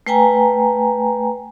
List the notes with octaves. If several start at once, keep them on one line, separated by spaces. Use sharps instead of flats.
A3 B4 G5 G#5 A#5